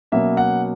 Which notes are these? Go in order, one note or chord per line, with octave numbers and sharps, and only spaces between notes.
B2 F#3 A#3 C#4 E5
F#5